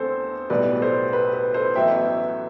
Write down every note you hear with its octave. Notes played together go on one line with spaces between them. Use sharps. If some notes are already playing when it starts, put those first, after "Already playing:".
Already playing: E2 D3 A3 C4 A4 C5
B1 A2 G3 B4 D5
A4 C5
B4
B4
A4 C5
A1 A2 F#3 B3 E5 G5